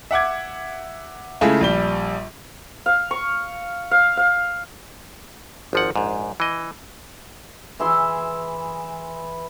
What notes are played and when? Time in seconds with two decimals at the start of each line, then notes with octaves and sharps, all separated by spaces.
0.11 E5 F#5 D6 G#6
1.41 C#3 G#3 A3 E4 F4
1.61 A#1 G3 G7
2.86 F5
3.11 C#6
3.91 F5
4.17 F5
5.73 G#1 F3 F#5
5.96 A#1 G#2
6.40 E3 D#5
7.80 E3 G#4 E5 C6